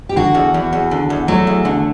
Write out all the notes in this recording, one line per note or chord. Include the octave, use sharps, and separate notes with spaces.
G4
D3 F#4
E2
E2
E2
D3
E2
F#3 A3
E2
D3